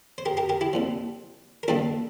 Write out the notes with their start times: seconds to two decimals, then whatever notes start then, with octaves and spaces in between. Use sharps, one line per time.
0.18 C5
0.26 G4 A#4
0.37 G4 A#4
0.49 G4 A#4
0.61 E4 G4
0.73 C2 A#2 F3
1.63 A#4
1.68 A1 G2 D3 G3 A#3 F4 A4